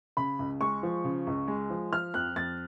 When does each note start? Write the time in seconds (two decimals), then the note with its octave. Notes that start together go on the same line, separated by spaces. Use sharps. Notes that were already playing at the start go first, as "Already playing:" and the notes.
0.17 C#3 B5
0.39 C#2
0.61 G#3 C#6
0.83 F3
1.04 C#3
1.27 C#2
1.48 G#3
1.70 F3
1.93 F3 F6
2.14 F2 F#6
2.36 F2 A6